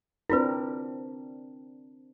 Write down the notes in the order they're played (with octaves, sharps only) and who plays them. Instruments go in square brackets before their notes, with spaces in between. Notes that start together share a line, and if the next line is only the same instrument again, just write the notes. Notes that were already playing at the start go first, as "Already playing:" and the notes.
[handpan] C4 D4 A#4 [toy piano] E4 F4 B4